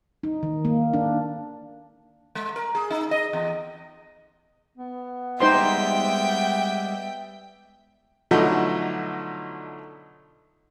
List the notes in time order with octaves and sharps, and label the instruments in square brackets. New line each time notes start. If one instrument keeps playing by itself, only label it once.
[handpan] D#4
D#3
A#3
D4
[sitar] G#3
A#4
G#4
D#4
D#5
E2
[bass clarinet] B3
[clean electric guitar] G3 G#3 G4 [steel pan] D#4 C5 C6 [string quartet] E5 G5
[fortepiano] B2 D3 F3 F#3 A3 D#4